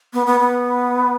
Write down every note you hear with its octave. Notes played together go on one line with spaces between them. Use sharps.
B3
B3
B3